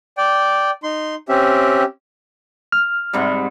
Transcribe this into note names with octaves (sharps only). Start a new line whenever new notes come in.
D5 G5
D#4 C6
C4 C#4 G4 E5
F6
G#2 C3 G3